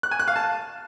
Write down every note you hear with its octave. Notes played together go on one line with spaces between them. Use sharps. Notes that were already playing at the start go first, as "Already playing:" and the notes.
F#6
G#5
F#6
F5
A5